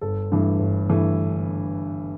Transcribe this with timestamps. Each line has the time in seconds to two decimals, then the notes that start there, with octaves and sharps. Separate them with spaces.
0.01 G1 A4
0.32 G2 E3 A3
0.59 G1
0.89 G2 E3 A3